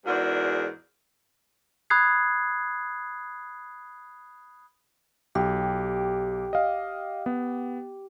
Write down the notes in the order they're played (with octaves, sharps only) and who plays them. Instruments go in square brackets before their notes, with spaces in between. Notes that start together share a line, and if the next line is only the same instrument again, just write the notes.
[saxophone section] E2 G#2 D4 F#4 A#4
[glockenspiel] B5 D#6 F#6 G#6 C7
[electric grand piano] B1 [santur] G4
[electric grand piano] D#5 F5
B3